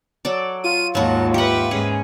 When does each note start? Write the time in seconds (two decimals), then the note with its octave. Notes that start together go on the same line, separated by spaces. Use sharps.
0.25 F#3 A4 D5
0.64 F4 D#7
0.95 D#2 G#2 F#3 F#4 A5
1.34 G4 B4 E5 F#5
1.71 G#2 C#4 G#4